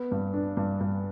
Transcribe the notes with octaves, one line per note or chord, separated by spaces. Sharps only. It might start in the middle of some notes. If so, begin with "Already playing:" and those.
Already playing: B3
G2
D4
G2
G2